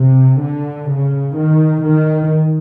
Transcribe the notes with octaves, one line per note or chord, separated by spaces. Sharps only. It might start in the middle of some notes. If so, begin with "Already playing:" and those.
Already playing: C3
D3
C#3
D#3
D#3